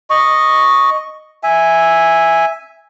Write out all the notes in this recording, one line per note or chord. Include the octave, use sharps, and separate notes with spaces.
D#5 C#6
E5 G#5